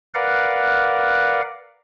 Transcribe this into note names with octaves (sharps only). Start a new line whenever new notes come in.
A#4 B4 D5 F5 F#5